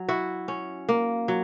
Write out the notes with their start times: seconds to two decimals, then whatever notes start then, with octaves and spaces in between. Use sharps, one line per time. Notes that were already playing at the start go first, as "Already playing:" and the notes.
Already playing: F#3
0.08 E4 F#4
0.48 C#4
0.89 A#3
1.28 F#3